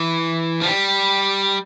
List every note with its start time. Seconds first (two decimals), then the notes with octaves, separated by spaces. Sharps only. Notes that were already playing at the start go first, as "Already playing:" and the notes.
Already playing: E3
0.61 F3
0.65 G3